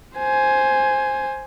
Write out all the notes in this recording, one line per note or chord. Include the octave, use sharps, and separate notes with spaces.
C5 G#5